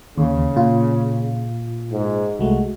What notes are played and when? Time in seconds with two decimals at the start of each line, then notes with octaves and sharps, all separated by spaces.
0.18 D#2 C#3
0.56 A#2 F4
1.92 G#2
2.39 C2 G#3 A3 F#4